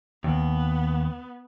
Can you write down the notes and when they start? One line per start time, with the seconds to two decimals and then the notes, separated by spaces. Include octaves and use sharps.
0.24 D#2 B3